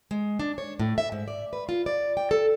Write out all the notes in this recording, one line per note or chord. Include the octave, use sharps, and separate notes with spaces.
G#3
D4
C#5
A2
E5
G#2
D5
B4
F4
D5
G5
A4